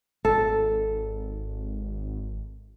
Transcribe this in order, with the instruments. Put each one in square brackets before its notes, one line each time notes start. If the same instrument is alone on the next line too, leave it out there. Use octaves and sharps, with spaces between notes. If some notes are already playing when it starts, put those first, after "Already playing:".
[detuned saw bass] G#1 [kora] A4